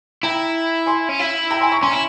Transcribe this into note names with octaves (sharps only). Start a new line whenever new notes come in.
E4 G5 A#5
G#5 C6
C#4
E4
G5 A#5
G#5 C6
A#5 C#6
C#4 G#5 C6
E4